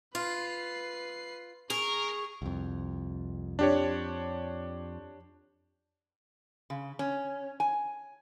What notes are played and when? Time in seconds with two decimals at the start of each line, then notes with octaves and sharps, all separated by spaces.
0.15 F4 B4 C7
1.70 G#4 A#4 C#6
2.42 C2 F2
3.59 F2 D4 G4 C#5
6.70 C#3
6.99 C#4
7.60 G#5